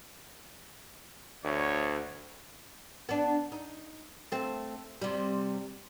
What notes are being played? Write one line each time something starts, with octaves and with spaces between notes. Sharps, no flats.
D2 C#5
B3 D4
D#4
A3 C4
C3 G3